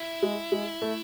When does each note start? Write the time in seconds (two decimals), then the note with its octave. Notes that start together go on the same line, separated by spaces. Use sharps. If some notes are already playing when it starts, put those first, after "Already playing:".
Already playing: E4
0.23 G#3
0.52 G#3
0.82 A3